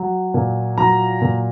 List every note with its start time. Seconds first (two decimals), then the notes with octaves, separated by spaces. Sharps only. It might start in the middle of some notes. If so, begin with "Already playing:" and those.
Already playing: F#3
0.34 A#2
0.78 F#3 A#5
1.21 A#2